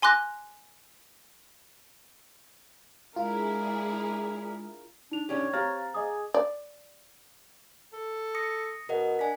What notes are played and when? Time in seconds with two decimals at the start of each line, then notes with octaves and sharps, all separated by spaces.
0.02 G#5 C6 D6 F#6 A#6
3.16 G#3 D4 E4 F4 G#4 A#4
5.11 D4 D#4 F7
5.29 C#4 D4 G4 C#5
5.53 C4 G4 F5 A#5 F6 A6
5.94 G#4 D#5 D6 D#6
6.34 D5
7.93 A4
8.35 D#6 A#6 C#7
8.89 B2 A#4 D#5 F#5
9.19 D4 G#5 B6